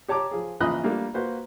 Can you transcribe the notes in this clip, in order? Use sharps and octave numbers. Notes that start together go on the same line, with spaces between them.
G4 C#5 A5 A#5 D6
F3 G#4
A#1 C#3 E3 D#5 B5 F#6
G3 A3 A#3 D4
A#3 F#4 B4 C5